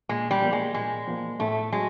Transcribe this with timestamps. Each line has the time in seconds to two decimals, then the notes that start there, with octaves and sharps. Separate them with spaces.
0.09 A#2 G#3
0.31 G3
0.42 F3 A#3
0.53 G#3
0.74 A#2 G#3
1.07 F3 A#3
1.40 A2 A3
1.72 F#3 G#3